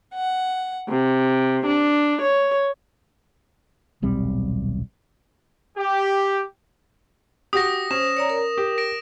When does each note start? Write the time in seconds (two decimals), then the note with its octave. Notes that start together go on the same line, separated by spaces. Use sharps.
0.15 F#5
0.88 C3
1.66 D4
2.21 C#5
4.02 D#1 B1 G3 C4
5.77 G4
7.53 F#4 G4 D#6 A#6
7.91 C#4 C5 E7
8.17 C#5 D5 A#5
8.30 A#4
8.58 G4
8.78 A#6 D7